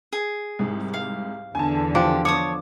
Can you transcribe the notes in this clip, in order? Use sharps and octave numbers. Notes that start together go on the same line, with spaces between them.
G#4
C2 G#2
F5
E2 D3 G#5 A5
F3 D4 G4
C#5 A5 D6 D#6